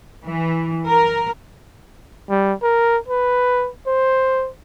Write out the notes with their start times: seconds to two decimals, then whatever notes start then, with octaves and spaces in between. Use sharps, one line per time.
0.25 E3
0.88 A#4
2.30 G3
2.63 A#4
3.08 B4
3.87 C5